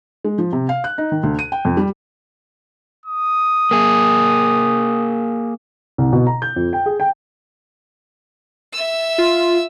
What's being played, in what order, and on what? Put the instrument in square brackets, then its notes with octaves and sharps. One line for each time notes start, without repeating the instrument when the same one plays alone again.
[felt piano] G#3
F3
C3
F5
F#6
D#4
D#3
D2
D#7
G5
F2
G3
[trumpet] D#6
[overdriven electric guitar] A#3 G#4
[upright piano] C2
B2
A#5
G6
F2
G5
G#4
G5
[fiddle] E5 E6
[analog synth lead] F4